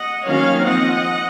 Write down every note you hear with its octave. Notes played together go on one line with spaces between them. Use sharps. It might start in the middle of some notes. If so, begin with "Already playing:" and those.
Already playing: D#5 F#5
D#3 F#3 A#3 C#4 C#5 F5
F3 C4 D#5 F#5